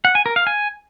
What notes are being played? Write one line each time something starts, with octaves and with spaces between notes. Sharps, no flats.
F#5
G#5
A#4
F5
G#5